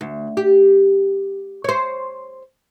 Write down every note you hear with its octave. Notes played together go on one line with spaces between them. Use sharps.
D2
G4
C5 C#5